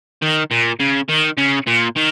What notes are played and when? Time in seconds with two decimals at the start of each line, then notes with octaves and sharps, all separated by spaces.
0.22 D#3
0.51 A#2
0.80 C#3
1.09 D#3
1.38 C#3
1.67 A#2
1.96 D#3